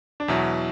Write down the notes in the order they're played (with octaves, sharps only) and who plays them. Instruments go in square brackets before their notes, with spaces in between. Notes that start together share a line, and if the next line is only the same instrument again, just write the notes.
[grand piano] D4
[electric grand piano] E2 B2 F#3 [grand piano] E4